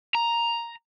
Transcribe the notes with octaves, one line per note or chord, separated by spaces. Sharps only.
A#5